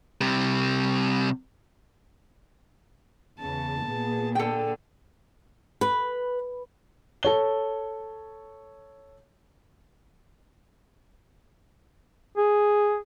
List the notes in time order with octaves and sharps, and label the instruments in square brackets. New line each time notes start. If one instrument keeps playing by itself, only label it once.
[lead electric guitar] C3 G3
[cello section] E2 C#3 [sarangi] A5
[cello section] A#2 B3 G#4
[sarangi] D3 [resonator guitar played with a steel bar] A4 G5
[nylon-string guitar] B4
[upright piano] A4 C#5 G7
[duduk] G#4